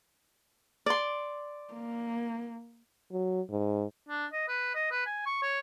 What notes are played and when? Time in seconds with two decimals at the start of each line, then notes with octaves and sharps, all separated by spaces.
0.86 D5 C6
1.74 A#3
3.12 F#3
3.51 G#2
4.09 D4
4.33 D#5
4.48 B4
4.75 D#5
4.91 B4
5.06 G#5
5.26 C#6
5.42 C#5